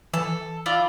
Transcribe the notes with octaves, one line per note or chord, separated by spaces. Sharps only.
E3 A4
E4 F4 D5